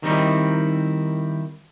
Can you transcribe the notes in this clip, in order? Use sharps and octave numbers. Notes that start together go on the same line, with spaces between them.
D#3 G3 C4 D#4 E4